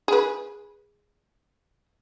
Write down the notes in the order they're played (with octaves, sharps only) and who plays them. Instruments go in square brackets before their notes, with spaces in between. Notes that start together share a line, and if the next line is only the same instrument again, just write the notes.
[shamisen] G#4 B4